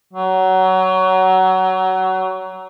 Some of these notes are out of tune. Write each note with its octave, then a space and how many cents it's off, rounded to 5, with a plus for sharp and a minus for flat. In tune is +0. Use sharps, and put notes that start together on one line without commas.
F#3 +20